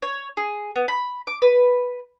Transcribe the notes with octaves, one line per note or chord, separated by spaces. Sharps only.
C#5
G#4
B3
B5
D6
B4